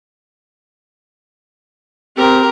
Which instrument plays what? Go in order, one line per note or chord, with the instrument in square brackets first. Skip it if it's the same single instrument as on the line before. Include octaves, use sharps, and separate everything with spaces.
[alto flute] C4 [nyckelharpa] G4 A#4